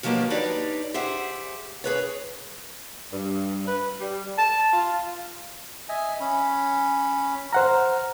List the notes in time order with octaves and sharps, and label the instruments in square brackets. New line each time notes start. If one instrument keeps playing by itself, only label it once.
[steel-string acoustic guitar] D#3 F3 F#3 A#3 G4 B4
D4 D#4 G4 B4 C#5 D5
G4 G#4 C5 E5 F#5
G#4 B4 C#5
[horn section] G2
B4
G3
A5
F4
[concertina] D#5 E5 G#5
C#4 B5
[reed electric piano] C5 F#5 A#5 [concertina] F6